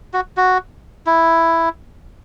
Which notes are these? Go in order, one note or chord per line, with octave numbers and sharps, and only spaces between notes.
F#4
F#4
E4